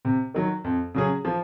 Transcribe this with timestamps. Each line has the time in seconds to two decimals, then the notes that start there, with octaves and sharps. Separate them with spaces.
0.05 C3
0.34 D#3 F#3
0.64 F2
0.95 C#3 F#3 C#4 G#4
1.25 F3